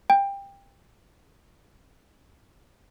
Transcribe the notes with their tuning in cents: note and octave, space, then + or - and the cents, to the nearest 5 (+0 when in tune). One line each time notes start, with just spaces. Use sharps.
G5 +20